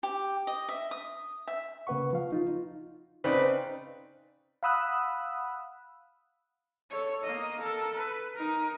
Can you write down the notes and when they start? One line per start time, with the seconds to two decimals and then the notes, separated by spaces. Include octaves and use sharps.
0.03 G4
0.47 D#5
0.69 E5
0.91 D#6
1.47 E5
1.87 C#3 A#3 B4 F#5 C#6
2.13 F3 F5
2.32 D#4 F4
3.24 C#3 C4 D#4 B4 D5
4.63 F5 F#5 B5 D#6 E6 F#6
6.91 A4 C#5
7.24 A#3 D#5
7.60 A4 A#4
7.95 B4
8.36 D#4 A#4